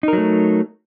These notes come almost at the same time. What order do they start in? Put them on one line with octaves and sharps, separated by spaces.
D#4 A#4 F#3 A3